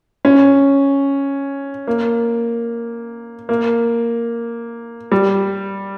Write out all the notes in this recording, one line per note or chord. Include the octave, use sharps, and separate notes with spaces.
C#4
A#3
A#3
G3